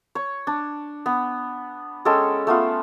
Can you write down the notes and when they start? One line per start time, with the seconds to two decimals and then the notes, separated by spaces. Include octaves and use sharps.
0.15 C#5
0.47 D4
1.06 B3
2.05 G#3 C#4 A4 G5
2.47 A3 B3 F4